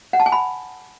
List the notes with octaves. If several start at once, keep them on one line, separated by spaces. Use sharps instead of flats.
F#5
A5
G#5
B5